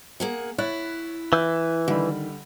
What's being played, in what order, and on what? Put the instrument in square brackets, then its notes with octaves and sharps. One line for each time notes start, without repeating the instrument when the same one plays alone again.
[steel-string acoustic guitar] A#3 G#4 F#5
[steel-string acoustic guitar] E4 [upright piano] C#5 F#6 A6
[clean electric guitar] E3 [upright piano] E6 F#6 G6
[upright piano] D3 G3 B5 [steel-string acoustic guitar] D#3